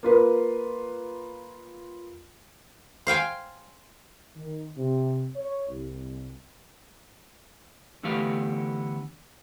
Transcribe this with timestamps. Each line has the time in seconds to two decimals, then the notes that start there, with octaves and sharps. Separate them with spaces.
0.03 A#3 F4 B4
3.07 C5 F5 G5 G#5
4.36 D#3
4.77 C3
5.35 C#5
5.68 C2
8.03 D3 E3 A3 B3 G4 F5